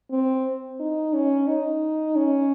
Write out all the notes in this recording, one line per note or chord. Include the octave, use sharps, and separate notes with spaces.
C4
D#4
C#4
D#4
C#4